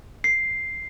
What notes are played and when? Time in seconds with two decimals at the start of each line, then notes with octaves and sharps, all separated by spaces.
0.24 C7